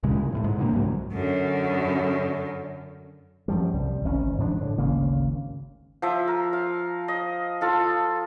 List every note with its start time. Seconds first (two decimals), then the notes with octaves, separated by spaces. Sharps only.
0.03 D2 A#2 C#3 G#3
0.17 C2
0.33 F2 A2
0.44 G#2
0.59 A#2 D3 F#3 A#3
0.71 C2 G#2 F#3
1.13 F#2 D3
3.48 F#2 F3 G3
3.74 C2 G3
4.05 G#1 C#4
4.38 G#2 D3 F3 D4
4.57 A2 D3
4.78 G#1 D2 C#3 A#3
6.02 F3 E5
6.28 A#4
6.53 F5
7.08 D#5
7.61 F4 A4 F5